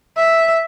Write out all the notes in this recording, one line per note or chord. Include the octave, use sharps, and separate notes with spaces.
E5